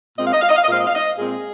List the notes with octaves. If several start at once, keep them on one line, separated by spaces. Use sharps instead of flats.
A#2 G#3 C4 D#5
F5
D#5
F5
D#5
F5
D#5
A#2 G#3 C4 F5
D#5
F5
D#5
A#2 G#3 C4 G#4